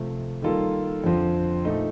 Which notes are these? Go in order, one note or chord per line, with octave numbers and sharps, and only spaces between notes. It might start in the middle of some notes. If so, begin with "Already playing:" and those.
Already playing: C3 F3 A3
D#3 G3 A#3 F4 A4
F2 D3 F3 C4
A#2 A3 D#4